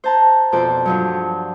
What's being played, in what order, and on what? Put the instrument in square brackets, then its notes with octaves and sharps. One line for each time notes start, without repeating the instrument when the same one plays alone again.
[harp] C5 A5 A#5
F2 B2 A4 C5 D5
G2 F3 F#3